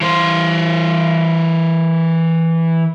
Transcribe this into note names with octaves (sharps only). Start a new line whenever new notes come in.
E3 C5